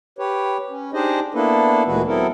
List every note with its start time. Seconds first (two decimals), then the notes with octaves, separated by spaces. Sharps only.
0.19 G4 B4 C#5
0.70 C#4
0.93 D4 D#4 G4 G#4 C5 D#5
1.34 A#3 B3 D4 E4 A4 B4
1.86 D2 A#2 E3 G#3 F#4 B4
2.07 F#3 B3 C4 E4 A4 A#4